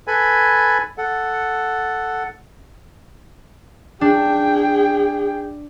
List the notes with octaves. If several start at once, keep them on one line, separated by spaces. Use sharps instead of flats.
A4 B4 G#5 B5
A4 F#5
D4 G#4 G5